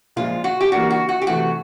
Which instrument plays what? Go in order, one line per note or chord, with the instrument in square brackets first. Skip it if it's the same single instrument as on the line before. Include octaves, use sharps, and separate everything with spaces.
[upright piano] A#2 F3 G#3 [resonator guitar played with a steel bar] F4
[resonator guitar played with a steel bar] F#4
G4
[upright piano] E3 G3 A#3 D4 [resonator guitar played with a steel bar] F#4
[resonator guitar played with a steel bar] F#4
F#4
G4
[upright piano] C3 E3 A3 [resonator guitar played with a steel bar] F#4